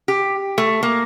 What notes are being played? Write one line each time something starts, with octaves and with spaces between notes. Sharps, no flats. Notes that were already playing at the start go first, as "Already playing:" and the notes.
G4
A3
A#3